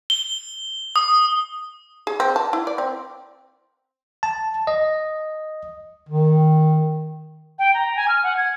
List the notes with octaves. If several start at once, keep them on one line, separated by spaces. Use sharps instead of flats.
G7
D#6
G#4
C4
A5
E4
D5
C4
A5
D#5
D#3
G5
A#5
G#5
F6
F#5
G#6